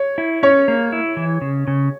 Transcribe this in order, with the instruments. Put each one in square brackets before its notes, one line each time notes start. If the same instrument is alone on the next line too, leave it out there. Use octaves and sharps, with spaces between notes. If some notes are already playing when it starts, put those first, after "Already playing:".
Already playing: [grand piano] C#5
[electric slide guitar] E4
[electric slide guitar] C#4 [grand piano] C#5
[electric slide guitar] A#3
E4
E3
C#3
C#3